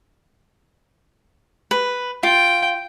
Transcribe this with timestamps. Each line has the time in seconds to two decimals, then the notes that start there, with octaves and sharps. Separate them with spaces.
1.71 B4
2.23 F4 G5